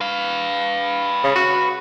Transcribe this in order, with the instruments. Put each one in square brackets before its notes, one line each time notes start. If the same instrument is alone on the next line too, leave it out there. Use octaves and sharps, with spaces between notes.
[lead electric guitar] B4 F5
[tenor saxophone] C#3
F#4